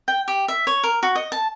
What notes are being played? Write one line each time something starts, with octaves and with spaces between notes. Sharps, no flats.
G5
G4
E5
C#5
A#4
F#4
D#5
A5